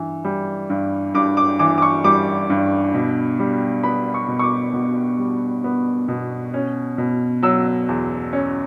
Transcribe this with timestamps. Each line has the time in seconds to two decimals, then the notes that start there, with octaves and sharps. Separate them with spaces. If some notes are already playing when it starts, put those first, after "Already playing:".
Already playing: G2 E3
0.25 G3
0.70 G2
1.14 G2 D6
1.37 D6
1.59 E3 D6
1.78 D6
1.82 C#6
2.04 G3 D6
2.50 G2
2.95 B2
3.39 G3
3.83 B3 B5
4.14 C#6
4.28 B2
4.39 C#6
4.43 D6
4.73 B2
5.19 G3
5.64 B3
6.08 B2
6.54 C#4
6.98 B2
7.43 F#3 E6
7.89 E2
8.33 C#4